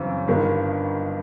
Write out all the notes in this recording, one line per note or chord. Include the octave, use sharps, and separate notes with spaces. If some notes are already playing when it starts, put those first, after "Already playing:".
Already playing: F#2 C#3 E3 G3 C4
G1 G2 D#3